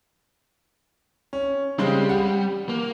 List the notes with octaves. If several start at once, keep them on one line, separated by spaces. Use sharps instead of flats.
C#4
C#3 G3 G#3 C4
F#5
A#3